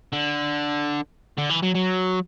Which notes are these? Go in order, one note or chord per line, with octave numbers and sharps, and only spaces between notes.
D3
D3
E3
F#3
F#3